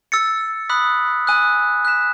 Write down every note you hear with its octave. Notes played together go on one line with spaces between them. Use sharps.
E6 A6 C#7
B5 D#6 F#6 B6
G#5 D#6 F#6
F#6 B6 E7